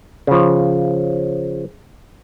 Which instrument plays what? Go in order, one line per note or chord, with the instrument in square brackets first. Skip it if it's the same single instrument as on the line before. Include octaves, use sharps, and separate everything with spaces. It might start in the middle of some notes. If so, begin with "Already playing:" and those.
[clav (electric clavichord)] C#3 F3